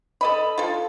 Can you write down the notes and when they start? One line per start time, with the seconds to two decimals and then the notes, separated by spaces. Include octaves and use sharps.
0.21 A4 D#5 B5
0.58 F4 A4